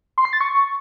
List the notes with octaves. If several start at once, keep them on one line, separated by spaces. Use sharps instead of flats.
C6
C7
A6
C#6